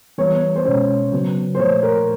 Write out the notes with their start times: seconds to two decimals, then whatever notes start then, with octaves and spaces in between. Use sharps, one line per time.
0.18 E3 G3 B3 C#5
0.56 C5
0.65 B2 G#3 C#4 C#5
1.12 C#3 F#3 B3
1.55 C5
1.59 A#2 F3 A3 C#5
1.83 A#4